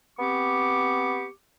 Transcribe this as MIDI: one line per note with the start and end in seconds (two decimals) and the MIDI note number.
0.19 1.28 59
0.19 1.28 60
0.19 1.28 67
0.19 1.28 85
0.19 1.28 86